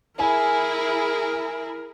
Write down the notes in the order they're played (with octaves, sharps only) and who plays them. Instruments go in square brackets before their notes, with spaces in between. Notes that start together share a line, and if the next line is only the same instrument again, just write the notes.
[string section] E4 G#4 [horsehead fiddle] A#4 [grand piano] G#5